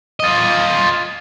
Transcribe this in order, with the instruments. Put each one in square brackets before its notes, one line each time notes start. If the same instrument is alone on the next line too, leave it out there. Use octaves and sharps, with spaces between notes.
[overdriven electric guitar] F4 D#5